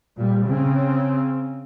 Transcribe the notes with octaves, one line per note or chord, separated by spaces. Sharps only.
A#2 G3
C#3 C4